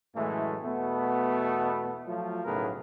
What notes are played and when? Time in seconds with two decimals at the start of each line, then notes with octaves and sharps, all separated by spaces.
0.15 F#2 A2 E3 G#3 A3
0.63 E2 B2 A3 B3
2.06 F3 F#3 A3 F4
2.45 B1 A2 C#3 G#4 A#4 B4